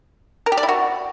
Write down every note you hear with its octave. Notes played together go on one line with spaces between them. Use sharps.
A#4
G4
D5
E4
F#4